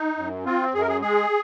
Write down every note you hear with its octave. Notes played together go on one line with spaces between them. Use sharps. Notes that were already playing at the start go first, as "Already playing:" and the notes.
Already playing: D#4
F#2
C4 F4
F#2 G#4
A#4
G#4
G#3 G#4